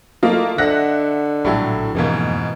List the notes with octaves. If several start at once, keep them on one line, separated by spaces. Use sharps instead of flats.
A3 A#3 E4 F4 D#5
D3 E5 F#5 F#6 A#6
A#1 A2 F#3 G3 E4 A4 E5
F2 G#2 B2 E3 A#3